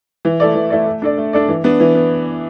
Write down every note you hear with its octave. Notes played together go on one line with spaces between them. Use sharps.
E3
A3 E4 A4 D5
E3
A3 E4 A4 D5
A3
D4 A4 D5
A3
D4 A4 D5
E3
B3 D4
E3
B3